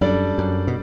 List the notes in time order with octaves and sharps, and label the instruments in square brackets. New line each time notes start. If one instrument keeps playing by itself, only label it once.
[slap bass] F#2 [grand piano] G3 D4 A4 D5
[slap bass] F#2
B2